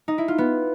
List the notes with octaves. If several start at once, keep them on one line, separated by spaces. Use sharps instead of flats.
D#4
E4
F4
B3